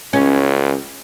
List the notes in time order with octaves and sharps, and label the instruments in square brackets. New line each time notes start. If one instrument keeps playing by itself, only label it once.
[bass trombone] C#2 [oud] C#4